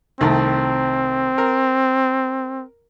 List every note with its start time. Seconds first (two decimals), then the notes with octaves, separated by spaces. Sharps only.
0.21 C2 D#3 A3 C4
1.38 A#4